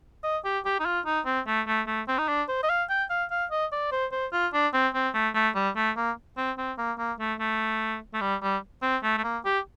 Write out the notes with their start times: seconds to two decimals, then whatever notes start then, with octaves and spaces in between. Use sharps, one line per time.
0.23 D#5
0.45 G4
0.65 G4
0.80 D#4
0.85 F4
1.06 D#4
1.26 C4
1.47 A3
1.67 A3
1.87 A3
2.08 C4
2.18 D#4
2.28 D4
2.48 C5
2.63 D#5
2.69 F5
2.89 G5
3.10 F5
3.31 F5
3.51 D#5
3.72 D5
3.91 C5
4.12 C5
4.32 F4
4.53 D4
4.73 C4
4.94 C4
5.14 A3
5.35 A3
5.55 G3
5.76 A3
5.97 A#3
6.37 C4
6.58 C4
6.78 A#3
6.98 A#3
7.19 A3
7.40 A3
8.13 A3
8.21 G3
8.42 G3
8.82 C4
9.03 A3
9.17 A3
9.24 A#3
9.45 G4